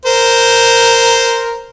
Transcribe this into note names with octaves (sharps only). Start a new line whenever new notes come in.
A#4 C5